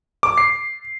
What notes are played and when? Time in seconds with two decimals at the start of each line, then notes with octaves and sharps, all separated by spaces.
0.23 D6
0.38 C7